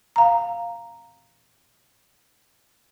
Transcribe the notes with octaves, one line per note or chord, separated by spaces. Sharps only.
F5 A#5